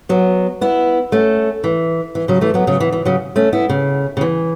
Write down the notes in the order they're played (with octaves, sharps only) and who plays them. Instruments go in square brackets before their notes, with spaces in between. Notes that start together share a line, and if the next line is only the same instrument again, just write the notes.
[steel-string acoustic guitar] F#3 B3
B3 E4
A3 C#4
E3
E3
C#3 F#3
E3 A3
F#3 B3
C#3 F#3
E3
E3
C#3 F#3
A3 C#4
B3 E4
C#3
C#3
E3